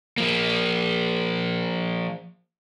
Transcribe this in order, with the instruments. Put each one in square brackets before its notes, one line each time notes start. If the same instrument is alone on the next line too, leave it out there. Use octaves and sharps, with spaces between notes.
[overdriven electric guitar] F3 A#3